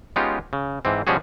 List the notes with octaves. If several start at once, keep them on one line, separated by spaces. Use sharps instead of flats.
G#3 B3 C#4 D#4 F4 G4
C#3
G#2 E3 C4
B2 F3 G3 C#4 F#4 G#4